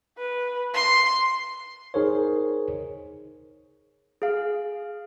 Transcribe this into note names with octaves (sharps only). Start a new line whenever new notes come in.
B4
C6
D#4 G#4 A#4 C5 C#5
G#4 F5